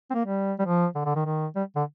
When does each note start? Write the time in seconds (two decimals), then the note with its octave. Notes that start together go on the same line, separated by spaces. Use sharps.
0.10 C4
0.14 A#3
0.25 G3
0.59 G3
0.65 F3
0.95 D3
1.05 D3
1.15 D#3
1.25 D#3
1.56 G3
1.76 D3